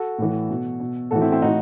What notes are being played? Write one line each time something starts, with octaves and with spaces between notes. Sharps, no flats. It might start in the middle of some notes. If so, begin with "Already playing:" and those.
Already playing: F#4 A4
A2 E3
B2
B2
A2 E3 F#4 A4
C4 E4
C4 E4
A2 E3 D#4 F#4